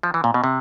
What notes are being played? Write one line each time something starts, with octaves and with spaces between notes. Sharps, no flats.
F3
E3
A#2
B2
C3